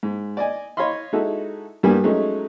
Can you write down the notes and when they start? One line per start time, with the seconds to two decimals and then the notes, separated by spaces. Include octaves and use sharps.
0.03 G#2
0.37 D5 D#5 G#5
0.77 C#5 D#5 F5 B5 C6
1.13 G#3 D#4 E4 F#4 A4
1.83 G2 G3 A#3 B3 G#5
2.04 F#3 G#3 A3 C#4 D#4